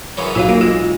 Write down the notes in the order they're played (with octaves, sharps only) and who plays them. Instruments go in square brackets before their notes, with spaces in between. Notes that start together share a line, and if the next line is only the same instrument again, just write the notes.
[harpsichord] F#2 C#3 E3
[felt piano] B1 F#4 [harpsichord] E3 [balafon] F4 C#5 F5
[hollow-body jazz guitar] A#3
[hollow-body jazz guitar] G#3 [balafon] F4